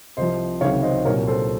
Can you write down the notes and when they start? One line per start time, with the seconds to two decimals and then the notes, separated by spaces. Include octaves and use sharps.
0.17 C2 C3 F3 C5 D#5
0.61 C#2 C3 D#3 F#3 C#5 F5
0.83 C5 D#5
1.05 C2 A#2 F#3 A#4 C#5
1.27 A4 C5